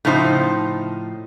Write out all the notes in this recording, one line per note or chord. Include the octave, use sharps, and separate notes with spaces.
A2 C#3 F3 D#4 C5